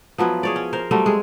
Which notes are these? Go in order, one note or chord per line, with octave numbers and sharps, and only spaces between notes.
F3 F#3 B3 E4
G#4 C#5 D5
C#4
A#4 C5 F5
F#3 G3 A3 C4
G#3 G#4